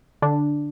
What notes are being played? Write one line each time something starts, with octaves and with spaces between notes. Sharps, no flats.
D3 D4